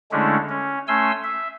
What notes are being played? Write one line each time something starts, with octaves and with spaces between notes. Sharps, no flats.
D3 G#3 A3 C#4 D4 E4
C#4
A3 C#4 G#5 C6 E6
E5